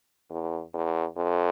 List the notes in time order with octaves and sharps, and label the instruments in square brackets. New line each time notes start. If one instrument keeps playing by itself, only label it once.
[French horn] E2
E2
F2